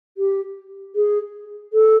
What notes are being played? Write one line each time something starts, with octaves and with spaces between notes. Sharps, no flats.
G4
G#4
A4